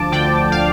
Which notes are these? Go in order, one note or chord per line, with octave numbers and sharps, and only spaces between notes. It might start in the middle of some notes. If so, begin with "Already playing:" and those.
Already playing: D2 F3 A5 D6
D3 D5 G5
F5